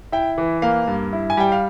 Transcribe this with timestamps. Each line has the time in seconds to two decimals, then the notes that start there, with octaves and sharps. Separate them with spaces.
0.12 E4 G5
0.38 E3
0.62 A#3 F5
0.87 G2
1.13 E4
1.30 G#5
1.37 G3 G5
1.52 F5